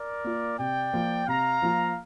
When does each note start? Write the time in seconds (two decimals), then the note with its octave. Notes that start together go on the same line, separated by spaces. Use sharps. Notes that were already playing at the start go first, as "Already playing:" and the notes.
Already playing: A#4 D5
0.24 A#3 F4
0.58 C3 D5 G5
0.93 F3 A#3 F4
1.27 C3 F5 A#5
1.62 F3 A#3 F4